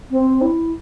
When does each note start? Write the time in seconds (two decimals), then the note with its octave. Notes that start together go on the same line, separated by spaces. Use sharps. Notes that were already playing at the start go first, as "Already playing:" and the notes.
0.11 C4
0.42 E4